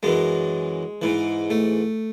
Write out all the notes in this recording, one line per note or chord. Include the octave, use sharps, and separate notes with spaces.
F#2 E3 G#3
G#2 E3
A3